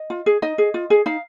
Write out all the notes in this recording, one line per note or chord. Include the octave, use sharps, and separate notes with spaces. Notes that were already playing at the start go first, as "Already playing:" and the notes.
Already playing: D#5
F4
G#4
D#4 D#5
G#4
F4
G#4
D#4 F5